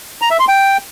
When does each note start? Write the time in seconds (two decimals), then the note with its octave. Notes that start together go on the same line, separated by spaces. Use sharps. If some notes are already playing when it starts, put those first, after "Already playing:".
0.22 A#5
0.31 E5
0.39 C6
0.48 G5